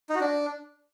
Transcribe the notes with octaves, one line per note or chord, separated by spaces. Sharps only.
D#4
F#4
D4